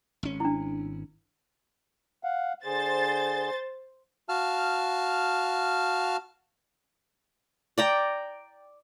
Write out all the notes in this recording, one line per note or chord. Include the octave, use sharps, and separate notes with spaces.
G#1 C#4
D4 E4
F5 F#5
D3 G#4 C5 A6
F#4 F5 A5 F6
D5 G5 A#5